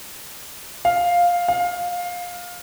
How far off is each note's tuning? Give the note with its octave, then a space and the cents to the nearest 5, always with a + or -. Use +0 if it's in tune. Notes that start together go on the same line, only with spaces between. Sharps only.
F5 +5
F5 +20